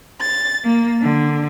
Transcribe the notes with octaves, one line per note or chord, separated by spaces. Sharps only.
A6
A#3
D3